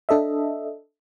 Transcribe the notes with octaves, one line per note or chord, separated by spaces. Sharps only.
D4 A4 D#5 E5